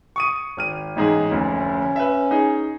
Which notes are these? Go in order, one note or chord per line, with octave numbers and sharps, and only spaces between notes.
C#6 D#6 D#7
G#1 F6 D#7
A1 G#2 D#4 G#4
F1 D2 C#4
B4 E5
D#4 G#4